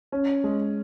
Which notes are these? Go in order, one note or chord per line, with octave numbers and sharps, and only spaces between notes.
C#4
G#3